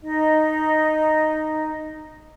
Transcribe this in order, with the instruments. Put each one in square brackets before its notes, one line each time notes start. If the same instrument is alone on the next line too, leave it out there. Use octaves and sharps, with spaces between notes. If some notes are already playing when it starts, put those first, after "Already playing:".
[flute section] D#4 D#5